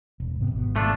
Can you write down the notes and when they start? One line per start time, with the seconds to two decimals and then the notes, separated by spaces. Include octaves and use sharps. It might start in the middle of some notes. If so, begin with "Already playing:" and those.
0.20 E1
0.39 G#2 C3 B3
0.51 G#1 B2
0.76 A3 D4 F4